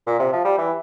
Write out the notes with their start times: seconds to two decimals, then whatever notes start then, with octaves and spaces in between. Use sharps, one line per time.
0.07 A#2
0.20 C3
0.33 F3
0.45 G3
0.58 E3